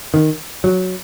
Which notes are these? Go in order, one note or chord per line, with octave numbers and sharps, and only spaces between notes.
D#3
F#3